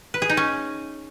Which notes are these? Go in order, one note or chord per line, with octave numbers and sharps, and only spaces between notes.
B4
G#4
D#4
C#4